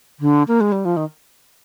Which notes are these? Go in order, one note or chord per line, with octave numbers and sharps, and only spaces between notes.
D3
A#3
G#3
G3
F3
D#3